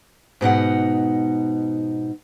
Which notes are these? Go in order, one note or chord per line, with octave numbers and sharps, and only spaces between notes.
G#2 B2 D#4 F#5